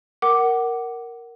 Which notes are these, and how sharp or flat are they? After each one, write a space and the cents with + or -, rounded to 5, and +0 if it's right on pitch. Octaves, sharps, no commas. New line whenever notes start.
A#4 +0 F#5 +20 D6 +0